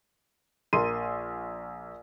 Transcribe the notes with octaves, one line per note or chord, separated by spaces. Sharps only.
A#1 A#4 C6 D#7